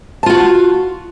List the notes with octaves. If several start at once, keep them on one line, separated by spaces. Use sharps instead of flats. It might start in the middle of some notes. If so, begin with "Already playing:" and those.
F4 F#4 A5